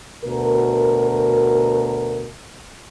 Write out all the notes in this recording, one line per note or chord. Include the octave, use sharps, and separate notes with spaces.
D2 B2 A#4